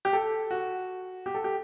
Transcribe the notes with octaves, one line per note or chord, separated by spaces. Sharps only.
G4
A4
F#4
G4
A4
G4